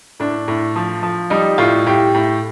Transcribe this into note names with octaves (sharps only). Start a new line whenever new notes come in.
A2 D4
A2
F3
F3
G3 D#4
A2 F4
A2 G4
A2